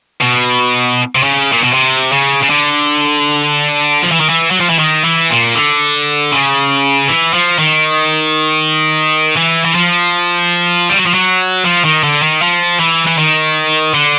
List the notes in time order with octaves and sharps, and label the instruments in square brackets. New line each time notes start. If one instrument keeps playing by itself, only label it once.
[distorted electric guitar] B2
C3
C#3
A#2
B2
C3
C#3
C#3
D3
F3
E3
D#3
E3
F#3
F3
E3
D#3
E3
A#2
D3
C#3
E3
F3
D#3
E3
E3
F3
G3
F#3
F3
F#3
F3
D#3
D3
D#3
F3
E3
E3
D#3
D3